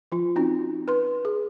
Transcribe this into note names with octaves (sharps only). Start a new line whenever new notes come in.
F3 F4
C4 C#4 D#4 F#4
B4 C6
G#4